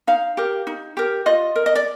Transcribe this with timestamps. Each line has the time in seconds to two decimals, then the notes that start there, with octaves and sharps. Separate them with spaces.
0.07 D#4 F5
0.37 G4 A#4
0.67 D#4
0.97 G4 A#4
1.26 F4 D#5
1.56 A#4
1.66 D#5
1.75 D5